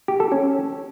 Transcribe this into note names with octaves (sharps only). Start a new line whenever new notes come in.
G4
A4
C#4